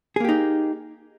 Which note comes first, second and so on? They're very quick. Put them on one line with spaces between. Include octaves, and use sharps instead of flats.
G#4 A#3 G4 D#4